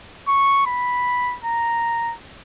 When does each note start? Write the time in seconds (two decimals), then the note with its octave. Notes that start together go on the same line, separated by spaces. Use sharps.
0.28 C#6
0.67 B5
1.44 A#5